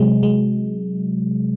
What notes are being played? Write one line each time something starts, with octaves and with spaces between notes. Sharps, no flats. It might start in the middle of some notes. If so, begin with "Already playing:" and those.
Already playing: C3 F#3 G#3
G#3